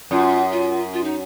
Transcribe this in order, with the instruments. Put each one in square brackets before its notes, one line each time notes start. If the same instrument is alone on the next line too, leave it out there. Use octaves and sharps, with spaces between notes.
[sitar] F#2 [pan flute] F4
[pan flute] F4
F4
D#4